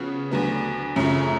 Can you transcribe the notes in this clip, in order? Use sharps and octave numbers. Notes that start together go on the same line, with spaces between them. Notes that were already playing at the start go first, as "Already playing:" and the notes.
Already playing: C#3 F3 B3 F#4
D2 D3 F#3 B3
F#2 C#3 F3 A3